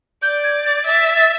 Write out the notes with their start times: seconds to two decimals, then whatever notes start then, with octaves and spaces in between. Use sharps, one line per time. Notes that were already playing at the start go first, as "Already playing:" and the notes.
0.22 D5 G6
0.44 G#6
0.66 A6
0.86 E5 A6